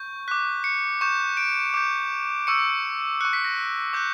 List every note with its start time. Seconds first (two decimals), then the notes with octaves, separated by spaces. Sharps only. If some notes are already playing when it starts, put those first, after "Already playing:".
Already playing: C#6 G6
0.28 D6 F#6 B6
0.64 C#7
1.01 C#6 G6 E7
1.37 D7
1.74 D6 G6
2.47 C#6 E6 G6 C#7
3.21 C#6 F#6 C#7
3.33 B6
3.45 A#6
3.93 D6 F#6 G6